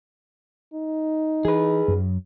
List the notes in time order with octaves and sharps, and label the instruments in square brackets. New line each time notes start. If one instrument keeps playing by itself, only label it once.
[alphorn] D#4
[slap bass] E3 [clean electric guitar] G#4 B4
[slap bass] F#2 F#3